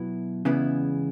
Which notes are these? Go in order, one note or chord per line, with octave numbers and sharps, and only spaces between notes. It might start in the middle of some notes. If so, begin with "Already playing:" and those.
Already playing: B2 F#3 B3 E4
E2 C#3 G#3 B3 E4